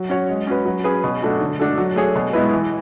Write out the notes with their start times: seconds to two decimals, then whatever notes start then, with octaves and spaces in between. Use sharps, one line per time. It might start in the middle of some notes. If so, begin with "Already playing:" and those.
Already playing: F#3
0.09 C#4 F#4 C#5
0.29 G#3
0.47 C#4 F#4 B4
0.65 F#3
0.84 C#4 G#4 B4
1.04 B2
1.22 F#3 A3 D4 F#4
1.41 D3
1.59 A3 D4 F#4 A4
1.78 F#3
1.96 A3 D4 G#4 C#5
2.16 B2
2.33 G#3 B3 E4 B4
2.53 E3